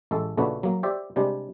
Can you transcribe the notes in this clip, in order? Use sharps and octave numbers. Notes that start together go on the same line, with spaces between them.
A1 G#3 A4
A#1 C#3 A3 D4 F#4 B4
F#3 A#3
G4 C5 D5 E5
C3 G3 G#3 D4